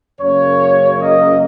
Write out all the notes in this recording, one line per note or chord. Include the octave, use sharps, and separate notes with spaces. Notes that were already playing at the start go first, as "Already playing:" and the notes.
F#2 C#3 A#3 C#5
D#5